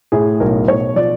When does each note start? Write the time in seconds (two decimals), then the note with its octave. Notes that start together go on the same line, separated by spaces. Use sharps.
0.12 A2 G#4
0.40 B1 A#4
0.67 B1 C#5
0.96 F3 D5